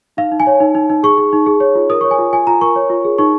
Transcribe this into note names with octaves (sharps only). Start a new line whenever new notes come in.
D#4 F5
D#4
G#5
C#5
D#4
D#4
D#4
G#4 C#6
G#4
D#4
G#4
C#5
F4
A#4 D#6
C#6
C#5
G#5
F4
F4 G#5
F4 A#5
A#4 C#6
C#5
F4
G#4
D#4 C#6